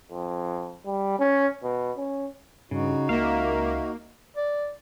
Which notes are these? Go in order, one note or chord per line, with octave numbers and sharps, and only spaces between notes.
F2
G3
C#4
B2
C#4
G2 C#3 D#4 F#4
C#2 A#3 E5 F5
D5